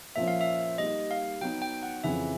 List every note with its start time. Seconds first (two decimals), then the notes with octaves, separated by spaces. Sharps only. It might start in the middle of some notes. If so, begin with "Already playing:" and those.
0.16 A#2 F3 A#3 C#4 E5
0.28 F5
0.41 E5
0.78 G3 A#3 D#4 G4 D#5
1.11 F5
1.41 F#3 B3 D#4 G5
1.62 G5
1.83 F#5
2.04 F2 C#3 E3 E5